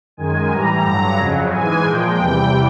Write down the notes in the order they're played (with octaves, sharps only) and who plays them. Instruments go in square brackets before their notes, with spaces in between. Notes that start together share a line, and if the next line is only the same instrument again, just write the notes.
[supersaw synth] F#2 D#3 G#3 G#5
A2 E3 G3 A#5
G2 D3 F#3 A#5
F2 C#3 F#3
G#2 E3 G#3 G#5
A#2 F3 G#3 G5
E2 C3 E3 G3